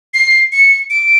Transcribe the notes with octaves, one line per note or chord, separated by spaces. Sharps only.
C7
C#7
D7